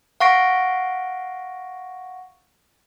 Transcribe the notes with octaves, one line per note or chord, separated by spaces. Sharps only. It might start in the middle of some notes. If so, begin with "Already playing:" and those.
F5 F#5 C#6 A#6 D7